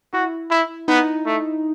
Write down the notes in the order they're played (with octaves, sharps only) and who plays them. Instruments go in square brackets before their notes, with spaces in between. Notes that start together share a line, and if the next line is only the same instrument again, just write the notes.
[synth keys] E4 [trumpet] F#4
[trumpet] E4
[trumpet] B3 [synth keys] D#4
[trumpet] A3